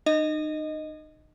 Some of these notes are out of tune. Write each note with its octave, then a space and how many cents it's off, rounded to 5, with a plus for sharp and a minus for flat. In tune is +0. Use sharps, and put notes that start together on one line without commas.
D#4 -35 D#5 +0